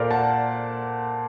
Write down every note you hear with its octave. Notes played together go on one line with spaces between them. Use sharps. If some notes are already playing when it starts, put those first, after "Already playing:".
Already playing: A#2 A4 A#4 C5 D5
F#5 A5